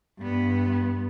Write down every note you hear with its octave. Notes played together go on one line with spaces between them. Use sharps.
G2 B3